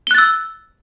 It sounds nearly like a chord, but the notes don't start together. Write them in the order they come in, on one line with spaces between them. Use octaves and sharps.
G7 F#6 A6 E6